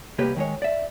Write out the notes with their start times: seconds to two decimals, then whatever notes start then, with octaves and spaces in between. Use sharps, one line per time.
0.18 C2 C3 A#3 G4 B4 C#5
0.36 D#3 G#3 C#5
0.62 D5 E5